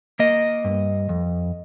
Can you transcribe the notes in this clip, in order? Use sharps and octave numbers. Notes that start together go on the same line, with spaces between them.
A#3 D#5
G2
F2